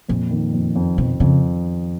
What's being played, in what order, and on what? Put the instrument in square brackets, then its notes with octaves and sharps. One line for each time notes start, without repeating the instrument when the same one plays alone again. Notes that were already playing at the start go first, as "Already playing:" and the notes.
[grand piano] F2 [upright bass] A#2
[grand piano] D#3
F2
F2
[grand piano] F2 [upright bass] B2
[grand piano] F2 [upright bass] C#3